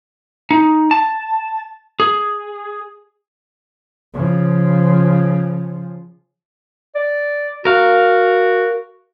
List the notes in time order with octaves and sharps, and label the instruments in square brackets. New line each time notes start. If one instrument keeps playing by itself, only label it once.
[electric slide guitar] D#4
A5
G#4
[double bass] C#3 F3
[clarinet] D5
[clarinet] F#4 [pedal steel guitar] A#4 F5